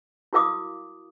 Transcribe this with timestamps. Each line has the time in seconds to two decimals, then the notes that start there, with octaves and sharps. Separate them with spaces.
0.33 E4 F#4 A#4 F5 D6 D#6